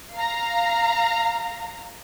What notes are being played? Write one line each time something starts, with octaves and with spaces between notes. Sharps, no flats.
F5 A#5